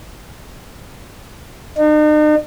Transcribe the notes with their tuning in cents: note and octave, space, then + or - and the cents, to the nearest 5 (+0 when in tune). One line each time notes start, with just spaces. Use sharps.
D#4 -45